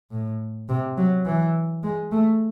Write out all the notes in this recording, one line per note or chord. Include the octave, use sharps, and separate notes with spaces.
A2
C3
F#3
E3
G#3
A3